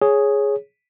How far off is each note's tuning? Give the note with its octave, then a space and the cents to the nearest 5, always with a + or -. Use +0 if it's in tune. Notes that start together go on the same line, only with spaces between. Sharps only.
G#4 +0 C#5 +0